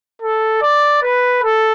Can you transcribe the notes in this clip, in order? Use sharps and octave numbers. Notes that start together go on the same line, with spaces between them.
A4
D5
B4
A4